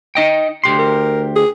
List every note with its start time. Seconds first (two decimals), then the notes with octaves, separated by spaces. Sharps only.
0.15 D#4 D#5 G5
0.64 D2 G4 C6
0.79 A#4
1.36 G#4